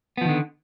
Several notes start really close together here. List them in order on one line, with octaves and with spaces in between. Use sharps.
B3 F3 D#3 D3